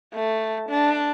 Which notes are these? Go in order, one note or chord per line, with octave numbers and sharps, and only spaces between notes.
A3
D4